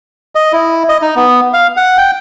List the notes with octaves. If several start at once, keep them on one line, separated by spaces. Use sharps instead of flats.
D#5
E4
D#5
D#4
B3
F5
F#5
G5